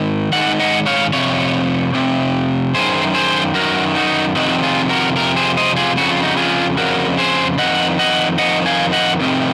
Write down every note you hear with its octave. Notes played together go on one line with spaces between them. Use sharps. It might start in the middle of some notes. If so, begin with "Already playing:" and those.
Already playing: G#2 D#3
G#2 D#3 F#5
D#5 F#5
C#5 F5
F2 C3 C#5
F2 C3
F#2 D#3 G#4 C5
G#4 C5
F#2 D#3 F#4 A#4
D#4 F#4
F2 C3 D#3 D#4 F#4
F4 G#4
F#4 A#4
F2 C3 A#4
G#4 C5
C5 D#5
F4 G#4
F2 C#3 F#4
F4
D#4 F#4
F4 G#4
F2 C#3 F#4 A#4
G#4 C5
F2 D#3 D#5 F#5
D#5 F#5
F2 D#3 D#5 F#5
F5 G#5
D#5 F#5
F2 C3 D#3